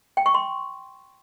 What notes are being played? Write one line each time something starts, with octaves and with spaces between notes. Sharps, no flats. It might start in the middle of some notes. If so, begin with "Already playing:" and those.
G5
C#6
C6